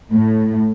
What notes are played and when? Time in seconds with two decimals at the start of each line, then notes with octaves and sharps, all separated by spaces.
0.13 A2